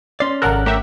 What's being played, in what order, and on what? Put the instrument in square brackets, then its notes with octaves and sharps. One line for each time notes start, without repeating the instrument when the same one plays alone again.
[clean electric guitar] C#4 D5 [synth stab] C6
[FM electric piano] G#1 F#5 F#6 [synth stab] C#3 A4 A#4
[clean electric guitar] A3 C#4 A#4 [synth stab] G4 E5